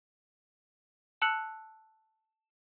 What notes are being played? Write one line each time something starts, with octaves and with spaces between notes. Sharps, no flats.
A5 E6 F#6 C#7 F#7